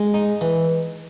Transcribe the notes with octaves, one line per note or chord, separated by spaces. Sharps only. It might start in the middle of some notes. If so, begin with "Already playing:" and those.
Already playing: G#3
D#4
E3